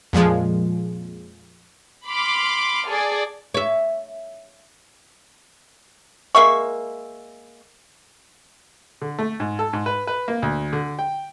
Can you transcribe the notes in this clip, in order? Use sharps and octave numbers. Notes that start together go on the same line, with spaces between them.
F2 A#2 F3 G#3
B5 C6 D6 F6
G#4 A4 D5
C#5 E5
G#3 A#3 E5 C#6
D3
A3
G#2
A4
G#2
B4
B4
A#3
D2
D3
G5